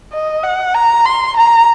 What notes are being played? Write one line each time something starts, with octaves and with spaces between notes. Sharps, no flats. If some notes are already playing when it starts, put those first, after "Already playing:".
D#5
F#5
A#5
C6
A#5